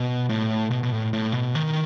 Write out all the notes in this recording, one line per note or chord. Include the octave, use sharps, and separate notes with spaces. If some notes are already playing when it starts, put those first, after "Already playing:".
Already playing: B2
A2
B2
B2
A2
A2
B2
D#3